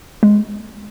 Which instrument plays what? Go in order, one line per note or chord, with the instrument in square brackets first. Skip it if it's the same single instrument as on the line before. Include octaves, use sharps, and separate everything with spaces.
[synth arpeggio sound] G#3